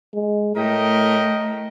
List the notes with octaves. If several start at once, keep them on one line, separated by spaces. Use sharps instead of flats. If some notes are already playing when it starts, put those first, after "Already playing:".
G#3
A2 A3 A#4 D#5 G5